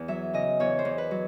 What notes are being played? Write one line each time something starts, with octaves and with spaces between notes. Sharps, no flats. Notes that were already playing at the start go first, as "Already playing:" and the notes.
Already playing: E2
F#3 E5
C#3 D#5
E2 C#5
C5
E2
B4
F#3